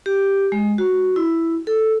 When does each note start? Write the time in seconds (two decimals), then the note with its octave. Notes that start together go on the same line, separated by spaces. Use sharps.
0.06 G4
0.52 G#3
0.78 F#4
1.16 E4
1.67 A4